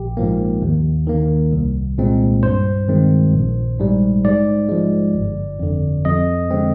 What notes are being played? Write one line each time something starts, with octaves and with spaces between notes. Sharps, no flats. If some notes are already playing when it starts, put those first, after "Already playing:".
Already playing: A#1 G4
G#2 F3 A#3
D#2
D#3 A#3
C2
A#2 G#3 C4
G2 C5
D#3 G#3 C4
A#1
G#2 G3
G#2 D5
F3 G#3
G1
F2 D3
F2 D#5
D3 G#3 C4